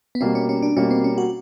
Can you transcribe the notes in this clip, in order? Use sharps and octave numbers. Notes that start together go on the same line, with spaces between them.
B3
B2 G3 A#3 C4
C#4
C#4
D4
B2 G3 A#3 C#4
C4
C#4
F#4